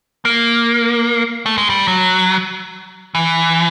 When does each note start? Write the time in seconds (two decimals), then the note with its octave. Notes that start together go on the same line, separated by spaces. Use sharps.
0.25 A#3
1.46 A3
1.58 G#3
1.70 G3
1.88 F#3
3.15 E3